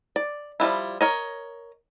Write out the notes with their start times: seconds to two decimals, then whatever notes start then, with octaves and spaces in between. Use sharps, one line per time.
0.16 D5
0.60 F3 G3 G#3 E4
1.01 A#4 C#5 D#5